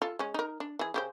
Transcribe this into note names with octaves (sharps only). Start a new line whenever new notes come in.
F4 A4
G#3 C#4
D#4 A#4
D4
E3 G#4
C#3 G4 C5